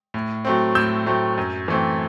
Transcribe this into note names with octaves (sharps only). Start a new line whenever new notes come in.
A2
F#3 A3 C4
A2 E6 G6
F#3 A3 C4
F#2
E3 A3 C4